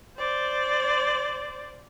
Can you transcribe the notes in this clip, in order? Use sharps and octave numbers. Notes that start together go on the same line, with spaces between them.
C5 D5